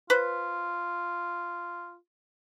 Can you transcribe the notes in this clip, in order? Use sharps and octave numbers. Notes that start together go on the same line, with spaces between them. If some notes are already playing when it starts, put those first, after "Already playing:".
F4 B4 C5